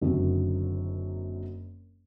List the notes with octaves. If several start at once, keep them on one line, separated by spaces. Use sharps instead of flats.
F#1 F#2 D3 D#3 F#3 C4